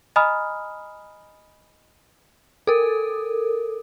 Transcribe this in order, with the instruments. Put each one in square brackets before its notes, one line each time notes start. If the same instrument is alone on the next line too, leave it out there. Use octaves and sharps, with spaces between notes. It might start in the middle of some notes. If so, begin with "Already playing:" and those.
[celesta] D#5 G#5 A#5 B5 D#6 F6
[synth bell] A4 A#4